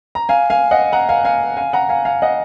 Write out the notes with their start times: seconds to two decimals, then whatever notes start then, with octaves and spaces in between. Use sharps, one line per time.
0.15 A#5
0.29 F5 G#5
0.50 F5 G#5
0.71 D#5 F#5
0.92 F#5 A#5
1.09 F5 G#5
1.25 F5 G#5
1.57 F5 G#5
1.73 F#5 A#5
1.89 F5 G#5
2.05 F5 G#5
2.22 D#5 F#5